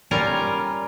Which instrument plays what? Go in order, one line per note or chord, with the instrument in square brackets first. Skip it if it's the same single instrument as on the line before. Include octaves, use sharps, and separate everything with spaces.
[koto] G3 C#4 F4 A#4 A#5